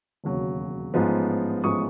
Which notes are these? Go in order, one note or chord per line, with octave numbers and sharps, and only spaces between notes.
E1 D#2 C#3 F#3
A1 G#2 F3 G#3 B3
A1 G#2 F3 G#3 B3 C#6 D#6